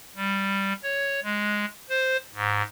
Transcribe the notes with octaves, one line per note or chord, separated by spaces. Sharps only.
G3
C#5
G#3
C5
G#2